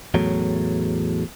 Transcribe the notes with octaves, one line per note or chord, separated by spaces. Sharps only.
E2 A2 F#3